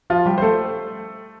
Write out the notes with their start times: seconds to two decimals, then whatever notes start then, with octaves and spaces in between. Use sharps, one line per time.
0.10 F3 F4
0.26 G3 G4
0.38 C5
0.42 A3 A4